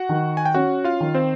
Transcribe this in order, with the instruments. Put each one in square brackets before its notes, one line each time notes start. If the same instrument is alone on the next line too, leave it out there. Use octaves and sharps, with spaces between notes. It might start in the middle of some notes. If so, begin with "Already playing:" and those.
Already playing: [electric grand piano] F#4 F#5
[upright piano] D#3
[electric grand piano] G#5
G5
[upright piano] C#4 [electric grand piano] F#4 F#5
[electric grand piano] F4 F5
[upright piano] D#3
[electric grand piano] C4 C5